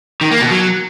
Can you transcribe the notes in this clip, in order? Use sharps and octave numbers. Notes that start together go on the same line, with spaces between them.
D#3
A#3
B2
F#3